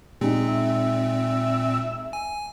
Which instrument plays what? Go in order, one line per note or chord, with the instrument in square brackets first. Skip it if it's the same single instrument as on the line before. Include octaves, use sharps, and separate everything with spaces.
[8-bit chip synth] A#2 C4 [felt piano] G#3 D#4
[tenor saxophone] E5
[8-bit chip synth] G#5